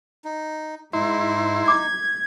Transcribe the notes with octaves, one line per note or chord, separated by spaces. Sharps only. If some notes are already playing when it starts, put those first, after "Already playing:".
D#4
G#2 D#4 E4 C6
D6 G#6